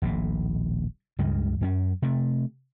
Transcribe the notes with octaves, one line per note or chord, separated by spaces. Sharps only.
D#1 A#1 A2
C#2 G2 C#3 G#3
F#2 C4 C#4
C3 A3